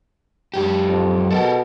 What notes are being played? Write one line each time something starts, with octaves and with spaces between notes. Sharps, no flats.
F#2 G4
F2
B2 A4 A#4